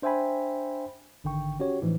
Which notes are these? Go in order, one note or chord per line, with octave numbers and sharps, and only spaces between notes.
D4 C5 E5 G5 G#5 B5
G#1 D3 D#3 G5 C#6
C#4 F#4 G4 C#5
A2 E3 F3 D#4